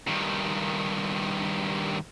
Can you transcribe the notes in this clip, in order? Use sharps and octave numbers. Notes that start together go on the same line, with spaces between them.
G2 D#3